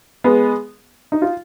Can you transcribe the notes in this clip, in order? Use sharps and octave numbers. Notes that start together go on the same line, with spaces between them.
G#3 B3
D#4
F4